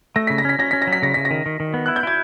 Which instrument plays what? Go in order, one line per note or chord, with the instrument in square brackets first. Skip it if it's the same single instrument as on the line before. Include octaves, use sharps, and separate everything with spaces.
[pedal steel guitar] A3 [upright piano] A#6
[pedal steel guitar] C#3 [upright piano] B6
[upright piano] A#6
[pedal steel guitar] C#4 [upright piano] B6
[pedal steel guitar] C#4 [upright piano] A#6
[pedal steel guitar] C#4 [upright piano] B6
[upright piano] A#6
[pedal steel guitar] F#3
[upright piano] B6
[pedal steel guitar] C#3 [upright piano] A#6
[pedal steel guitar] C#3 [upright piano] B6
[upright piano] A#6
[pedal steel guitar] D#3
D#3
D#3
B3
[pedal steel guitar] E4 [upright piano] F#6
[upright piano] G6
[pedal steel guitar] E4 [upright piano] G#6